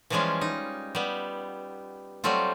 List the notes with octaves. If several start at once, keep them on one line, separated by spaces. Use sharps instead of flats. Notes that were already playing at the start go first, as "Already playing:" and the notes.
E3 F3 G3 G#3 C#4 F4
D#4
G3 B3
F#3 G3 A3 C4 F4